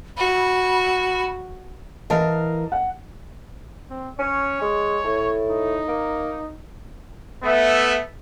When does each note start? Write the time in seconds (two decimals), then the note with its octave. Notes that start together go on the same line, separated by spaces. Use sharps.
0.18 F#4 B5
2.10 E3 A#4 D#5 F5 A5
2.72 F#5
3.90 C4
4.19 C#4 C#5
4.61 G#3
5.05 A2
5.50 D#4
5.88 A#3
7.44 A3 B3 E5